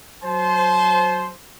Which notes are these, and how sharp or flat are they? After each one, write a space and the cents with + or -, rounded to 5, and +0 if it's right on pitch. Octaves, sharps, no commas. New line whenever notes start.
F#3 +0 C5 +0 A5 -35